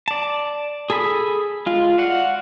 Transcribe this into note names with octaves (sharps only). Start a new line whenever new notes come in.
D5 A5
G#4 A4 G#5 B5
G#3 F4
F#4 D5 F5 F#5